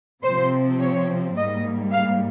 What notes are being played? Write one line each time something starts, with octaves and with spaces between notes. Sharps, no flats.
C3 F3 C4 C5
C#5
G#2 G3 A#3 D#5
F5